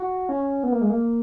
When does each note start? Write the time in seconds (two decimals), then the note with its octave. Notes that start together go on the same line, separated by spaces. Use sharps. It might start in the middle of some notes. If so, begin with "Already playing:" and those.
Already playing: F#4
0.29 C#4
0.63 B3
0.72 A#3
0.81 G#3
0.90 A#3